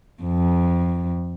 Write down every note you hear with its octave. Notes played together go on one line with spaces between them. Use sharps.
F2